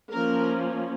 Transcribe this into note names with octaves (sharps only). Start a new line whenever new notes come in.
F3 A#3 C#4 A#4